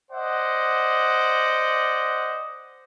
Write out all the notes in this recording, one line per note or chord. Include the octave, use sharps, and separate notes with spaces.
C5 D5 D#5 F#5